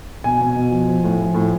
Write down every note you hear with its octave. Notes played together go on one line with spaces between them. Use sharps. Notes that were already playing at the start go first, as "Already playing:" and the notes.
B2 G#5
B2
B2
F3
F3
A2
F3
A2